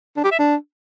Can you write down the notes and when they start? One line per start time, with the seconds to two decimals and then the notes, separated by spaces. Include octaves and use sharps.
0.17 D4
0.24 G4
0.31 E5
0.39 D4